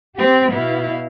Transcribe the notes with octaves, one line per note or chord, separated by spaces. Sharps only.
C4 G4
B2 B3 E4 F5